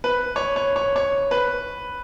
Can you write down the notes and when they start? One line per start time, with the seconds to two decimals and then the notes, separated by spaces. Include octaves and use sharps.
0.04 B4
0.36 C#5
0.56 C#5
0.76 C#5
0.96 C#5
1.31 B4